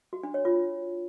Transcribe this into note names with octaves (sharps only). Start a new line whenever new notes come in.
F#4
D4
C#5
F4